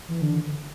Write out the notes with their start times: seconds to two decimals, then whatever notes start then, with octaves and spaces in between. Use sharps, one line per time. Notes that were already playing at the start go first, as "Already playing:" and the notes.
0.08 E3
0.21 D3